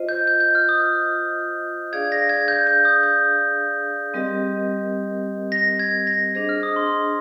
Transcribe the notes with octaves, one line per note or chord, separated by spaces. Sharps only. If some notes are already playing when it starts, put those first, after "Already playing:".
Already playing: F4 C5 D#5
G6
G6
G6
F6
D#6
D4 G#4 D5 F5 G#6
A#6
G#6
G6
G6
D#6
G6
G3 C4 G4 A#4 D#5
A#6
G#6
A#6
D4 G#4 C5 D#5
F6
D#6
C6